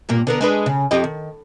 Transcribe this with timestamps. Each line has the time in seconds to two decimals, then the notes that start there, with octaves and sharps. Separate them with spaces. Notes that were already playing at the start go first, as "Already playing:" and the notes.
0.09 G2 A#2 A#3
0.27 D3 B3 A#4
0.41 G#3 D4 B4
0.66 C#3
0.91 F2 G4 D#5
1.04 D#3